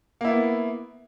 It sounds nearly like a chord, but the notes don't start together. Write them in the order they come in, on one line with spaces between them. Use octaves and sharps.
A#3 E4 B3